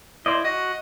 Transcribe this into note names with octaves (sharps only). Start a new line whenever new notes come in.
E4 C5 D5 D#5
F#4 D#5